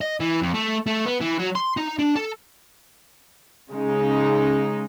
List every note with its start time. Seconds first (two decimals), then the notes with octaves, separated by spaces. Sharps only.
0.01 D#5
0.20 E3
0.42 F2
0.54 A3
0.87 A3
1.06 B3
1.21 E3
1.39 F#3
1.55 C6
1.77 D#4
1.99 D4
2.16 A4
3.71 C#3 G#3 D#4